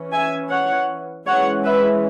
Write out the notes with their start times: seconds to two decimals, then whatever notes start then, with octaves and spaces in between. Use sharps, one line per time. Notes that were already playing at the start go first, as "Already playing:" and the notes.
Already playing: E3 C#4
0.12 E5 G#5
0.50 C#5 F#5
1.26 E3 G#3 C#4 C#5 F#5
1.65 B4 E5